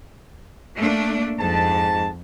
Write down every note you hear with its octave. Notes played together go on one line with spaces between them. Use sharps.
A3 A#3 D4
F2 G#2 A5